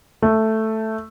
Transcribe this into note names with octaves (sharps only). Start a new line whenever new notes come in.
A3